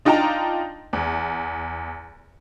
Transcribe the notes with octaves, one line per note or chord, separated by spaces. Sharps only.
D4 D#4 F4 G5 A5 A#5
E2